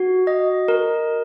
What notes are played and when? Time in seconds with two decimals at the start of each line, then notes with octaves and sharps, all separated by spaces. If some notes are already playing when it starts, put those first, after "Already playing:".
Already playing: F#4
0.27 D#5
0.68 A#4